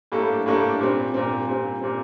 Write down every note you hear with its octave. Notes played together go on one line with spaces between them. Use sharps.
A2 G3 A#3 D4 A4
A2 G3 A#3 D4 A4
A#2 G3 C4
A#2 G3 C4
A#2 G3 C4
A#2 G3 C4